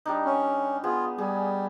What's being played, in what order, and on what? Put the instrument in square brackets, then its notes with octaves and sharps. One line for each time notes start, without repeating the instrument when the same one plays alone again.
[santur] G3 D4 D#4
[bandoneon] C#4
[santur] B3 G#4 [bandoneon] F4
[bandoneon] G3 [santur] G#4